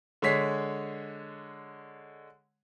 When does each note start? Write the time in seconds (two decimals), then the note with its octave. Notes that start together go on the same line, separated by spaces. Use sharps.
0.22 D3 G#3 C#5 B6 C7